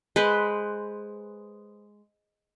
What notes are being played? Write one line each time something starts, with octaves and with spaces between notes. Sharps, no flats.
G#3 B4 C5